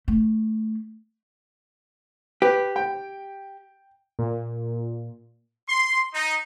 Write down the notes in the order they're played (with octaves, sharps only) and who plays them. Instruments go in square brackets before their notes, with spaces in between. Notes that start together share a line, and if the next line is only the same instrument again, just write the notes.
[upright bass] A3
[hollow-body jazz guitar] G4 [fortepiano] B4
[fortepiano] G5
[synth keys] A#2
[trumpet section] C6
D#4